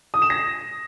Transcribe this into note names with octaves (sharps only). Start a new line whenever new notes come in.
D#6
E7
A#6